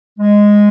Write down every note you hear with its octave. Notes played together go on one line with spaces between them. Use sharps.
G#3